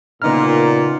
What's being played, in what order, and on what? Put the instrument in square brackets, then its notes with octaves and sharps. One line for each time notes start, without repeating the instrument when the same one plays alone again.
[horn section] A#2 [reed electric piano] C#3 F6 [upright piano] B3 D#4 A#5